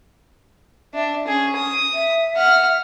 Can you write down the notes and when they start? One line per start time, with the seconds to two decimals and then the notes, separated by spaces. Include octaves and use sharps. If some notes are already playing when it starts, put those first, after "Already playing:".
0.94 D4 E5
1.27 C#4 G#4
1.56 D#6
1.94 E5
2.36 F#5 F6